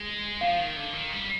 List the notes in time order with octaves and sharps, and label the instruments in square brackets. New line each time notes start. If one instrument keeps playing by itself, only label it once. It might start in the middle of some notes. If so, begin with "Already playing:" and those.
Already playing: [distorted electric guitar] G#3
[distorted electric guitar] F3 [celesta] F5
[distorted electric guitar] D#3
D3
D#3
G3